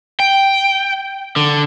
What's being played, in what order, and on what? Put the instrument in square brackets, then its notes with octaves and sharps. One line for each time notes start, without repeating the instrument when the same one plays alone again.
[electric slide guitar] G5
D3